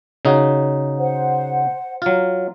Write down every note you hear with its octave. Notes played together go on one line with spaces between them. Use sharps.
C#3 D#4 F#4
C5 F#5
F#3 F4